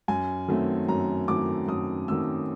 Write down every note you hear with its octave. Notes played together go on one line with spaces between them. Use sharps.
F#2 G#5
D#3 F#3 A3 C4
F#2 A#5
D#3 F#3 A3 C4 D6
F#2 D#6
D#3 F#3 A3 C4 E6